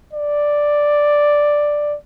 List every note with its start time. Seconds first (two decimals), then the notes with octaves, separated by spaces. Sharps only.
0.13 D5